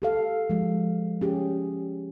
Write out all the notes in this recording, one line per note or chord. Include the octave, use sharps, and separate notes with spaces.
G4 A4 F5
F3 G#3
C#4 G4 G#4